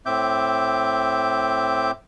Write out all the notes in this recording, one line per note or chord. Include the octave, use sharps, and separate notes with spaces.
A2 C4 E5 D6 G6